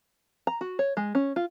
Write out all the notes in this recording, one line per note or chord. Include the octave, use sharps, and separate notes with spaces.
A#5
F#4
C#5
G#3
C#4
F4